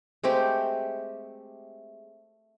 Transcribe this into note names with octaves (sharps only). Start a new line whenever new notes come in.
G#3 A3 C4 G4